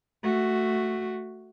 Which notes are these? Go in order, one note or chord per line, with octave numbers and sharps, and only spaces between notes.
A3 F#4